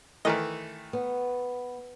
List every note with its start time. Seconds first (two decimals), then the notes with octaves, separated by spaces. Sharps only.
0.25 D#3 E3 A3 A#4 D#5
0.93 B3